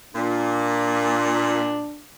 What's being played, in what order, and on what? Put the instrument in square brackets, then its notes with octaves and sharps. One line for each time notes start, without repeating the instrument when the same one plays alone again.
[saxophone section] A#2 [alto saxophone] D4